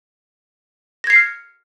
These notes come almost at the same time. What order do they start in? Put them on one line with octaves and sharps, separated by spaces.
A#6 G#6 C7 C#7 F6